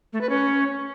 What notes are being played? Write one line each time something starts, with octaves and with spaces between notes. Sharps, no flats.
A3
B4
C#4